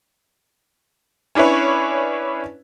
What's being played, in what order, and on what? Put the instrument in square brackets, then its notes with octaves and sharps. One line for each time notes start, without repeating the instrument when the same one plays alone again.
[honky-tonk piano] C#4 D4 E4 B4 C#5